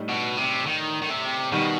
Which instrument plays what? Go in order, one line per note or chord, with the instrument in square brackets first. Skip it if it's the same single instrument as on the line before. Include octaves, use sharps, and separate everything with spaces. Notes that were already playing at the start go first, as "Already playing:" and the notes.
Already playing: [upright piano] A2 G3 D#4
[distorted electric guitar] B2
C3
D#3
D#3
C3
[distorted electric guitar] B2 [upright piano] D#3 G3